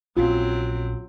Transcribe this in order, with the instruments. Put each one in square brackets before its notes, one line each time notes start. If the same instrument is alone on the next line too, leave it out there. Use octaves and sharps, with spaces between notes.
[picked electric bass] A#1 C#4 [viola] F#3 C4 [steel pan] F4